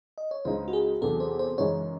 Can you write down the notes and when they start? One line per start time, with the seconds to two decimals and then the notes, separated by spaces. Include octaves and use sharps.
0.18 D#5
0.31 C#5
0.45 C#2 C#3 G#3 D#4 C5
0.68 F#4
0.73 G#4
1.01 E2 C3 F#3 A4
1.20 C5
1.39 C5
1.58 F#2 C#3 E3 G#3 D#4 C#5